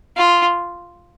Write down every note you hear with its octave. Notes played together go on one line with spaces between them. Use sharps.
F4